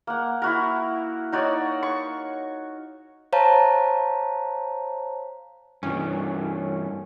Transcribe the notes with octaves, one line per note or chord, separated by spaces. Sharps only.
A#3 F#5
E4 F#4 A#4
D#4 F#4 C#5 D5
C#6
C5 C#5 F5 A5 A#5
G2 E3 C#4